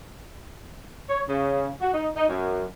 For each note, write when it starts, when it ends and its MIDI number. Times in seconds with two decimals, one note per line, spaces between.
1.09 1.22 73
1.27 1.71 49
1.81 1.92 66
1.93 2.07 63
2.16 2.25 63
2.27 2.64 42